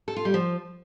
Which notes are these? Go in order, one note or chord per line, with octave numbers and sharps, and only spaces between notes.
A4
F4
G3
F3